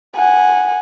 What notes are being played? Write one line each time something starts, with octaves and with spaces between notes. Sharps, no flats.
F#5 G#5